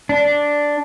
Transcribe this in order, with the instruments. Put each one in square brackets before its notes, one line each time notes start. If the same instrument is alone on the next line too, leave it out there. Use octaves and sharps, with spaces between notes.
[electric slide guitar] D4